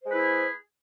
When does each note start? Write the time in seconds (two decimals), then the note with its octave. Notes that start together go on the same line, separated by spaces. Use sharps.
0.02 C5
0.06 G#3
0.10 B4
0.14 E4
0.18 G#4